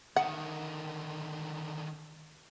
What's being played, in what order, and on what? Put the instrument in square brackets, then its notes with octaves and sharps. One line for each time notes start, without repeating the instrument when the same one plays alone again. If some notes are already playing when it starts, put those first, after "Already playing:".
[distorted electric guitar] D3 D#3 [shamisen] F#5